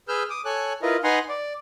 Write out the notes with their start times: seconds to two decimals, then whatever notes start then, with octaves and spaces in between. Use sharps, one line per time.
0.08 G#4 B4 E6 F6 G6
0.30 D6 D#6
0.45 A4 C#5 G#5 F#6
0.82 E4 F4 A#4 B4 D#5
1.04 D#4 B4 F#5 G#5 A#5 C6
1.29 D5